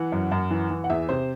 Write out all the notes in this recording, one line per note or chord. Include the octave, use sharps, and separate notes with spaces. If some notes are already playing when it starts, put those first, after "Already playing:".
Already playing: E3 F#5
F#2
F#2
E3
E3
F#5
E2 E5
C3 C5